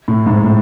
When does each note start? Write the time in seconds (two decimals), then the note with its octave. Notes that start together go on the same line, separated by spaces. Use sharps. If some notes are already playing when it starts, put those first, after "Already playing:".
0.08 A2
0.26 G#2
0.44 A2